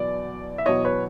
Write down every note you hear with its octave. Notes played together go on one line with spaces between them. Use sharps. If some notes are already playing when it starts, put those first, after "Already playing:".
Already playing: E2 B2 F#3 D5
E5
E2 B2 F#3 C#5 D#5
B4 C#5